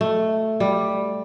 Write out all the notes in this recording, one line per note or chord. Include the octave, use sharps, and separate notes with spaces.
A3
G3